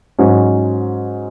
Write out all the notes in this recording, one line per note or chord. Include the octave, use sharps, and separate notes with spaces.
G#2 F#3 C#4